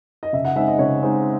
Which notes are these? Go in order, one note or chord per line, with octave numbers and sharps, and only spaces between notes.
D#5
C#3 E5
F#5
G#3 C4 D#4 E5
D#5
C#3 C#5
G#3 C4 D#4